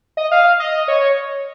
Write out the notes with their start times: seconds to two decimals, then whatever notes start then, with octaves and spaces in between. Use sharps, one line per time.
0.17 D#5
0.32 F5
0.60 D#5
0.88 C#5